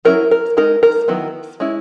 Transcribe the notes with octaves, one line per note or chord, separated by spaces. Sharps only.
F#3 C#4 E4 A#4
A#4
G#3 D#4 A#4
A#4
D#3 F#3 B3 E4
G#3 C#4 E4